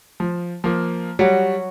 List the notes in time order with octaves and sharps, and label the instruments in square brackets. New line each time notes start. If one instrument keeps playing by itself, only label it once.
[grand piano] F3
F3 A#3
[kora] F#3 [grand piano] G3 F#4